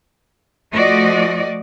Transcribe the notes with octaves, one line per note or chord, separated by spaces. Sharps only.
F3 A3 F#4 D5 D#5